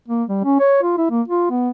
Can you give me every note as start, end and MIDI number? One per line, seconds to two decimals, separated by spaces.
0.08 0.24 58
0.29 0.40 55
0.44 0.58 61
0.60 0.80 73
0.83 0.96 65
0.98 1.10 64
1.11 1.22 58
1.28 1.46 65
1.50 1.70 59